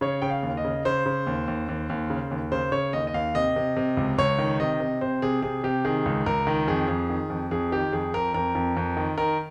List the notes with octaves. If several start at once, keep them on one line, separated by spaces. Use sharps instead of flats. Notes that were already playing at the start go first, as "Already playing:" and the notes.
C#3 C#5
C#3 G5
F5
D#2
D#5
C#3
C#3 C5
C#3
D#2
D#2
D#2
D#2
C#3
D#2
C#3 C5
C#3 C#5
D#2 D#5
D#5
D#2 F5
C3 D#5
C3
C3
C#2
C#2 C#5
D#3
C3 D#5
C3
C3 C5
C3 G#4
C3 G#4
C3 G4
D#3 G#4
C#2
C#2 A#4
D#3
F2 G#4
F2
D#3
F2
F2 G#4
D#3 G4
F2 G#4
F2 A#4
F2 A#4
F2
F2
D#3
D#3 A#4